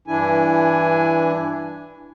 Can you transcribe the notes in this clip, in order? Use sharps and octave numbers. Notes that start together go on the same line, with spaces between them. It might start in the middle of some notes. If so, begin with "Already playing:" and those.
G2 E3 D4 E4 G#5